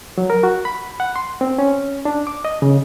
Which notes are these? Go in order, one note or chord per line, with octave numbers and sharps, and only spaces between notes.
F#3
A#4
F#4
B5
F#5
C6
C4
C#4
D4
D6
D#5
C#3